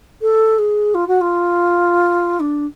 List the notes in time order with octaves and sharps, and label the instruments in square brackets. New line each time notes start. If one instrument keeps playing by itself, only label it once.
[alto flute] A4
G#4
F4
F#4
F4
D4